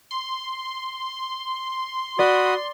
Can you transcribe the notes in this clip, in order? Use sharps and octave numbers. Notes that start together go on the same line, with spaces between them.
C6
F#4 D5 B5 D#6